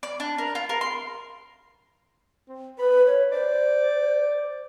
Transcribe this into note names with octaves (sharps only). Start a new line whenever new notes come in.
D5
D4
A#4
F4
A#4
C6
C4
B4 B5
C#5
C5 D5